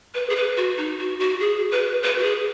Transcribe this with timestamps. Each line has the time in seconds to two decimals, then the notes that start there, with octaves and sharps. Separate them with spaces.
0.15 B4
0.30 G#4
0.36 B4
0.57 F#4
0.77 D#4
0.99 F#4
1.20 F#4
1.40 G#4
1.72 B4
2.03 B4
2.18 F#4
2.23 G#4